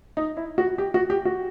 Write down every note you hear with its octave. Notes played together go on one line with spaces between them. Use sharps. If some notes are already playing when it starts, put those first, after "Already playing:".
D#4
E4
F#4
G4
F#4
G4
F#4